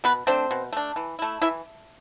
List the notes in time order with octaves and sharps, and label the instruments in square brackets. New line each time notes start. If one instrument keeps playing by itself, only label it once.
[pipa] B2 B3 B4
A3 C4 D4 C5
B2
A3 D4
E3
A3 E4
E3 E4 E5